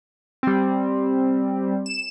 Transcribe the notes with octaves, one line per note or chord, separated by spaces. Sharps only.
G3 C4
E7